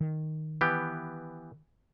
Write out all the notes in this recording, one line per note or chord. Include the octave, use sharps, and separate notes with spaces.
D#3
E3 B3 G4